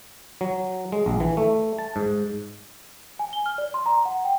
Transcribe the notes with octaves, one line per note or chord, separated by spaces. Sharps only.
F#3
G#3
A#1
E3
A3
A5
G#2
G#5
G7
F6
D5
C6
A#5
F#5
G5